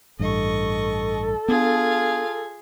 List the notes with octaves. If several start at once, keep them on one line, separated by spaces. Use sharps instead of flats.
A1 G2 A4 D#5 C#6
B3 D4 F4 G#4 F5 G#5